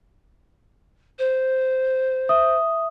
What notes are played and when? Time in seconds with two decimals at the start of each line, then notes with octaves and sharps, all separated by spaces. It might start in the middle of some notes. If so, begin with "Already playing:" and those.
1.18 C5
2.29 E5 D#6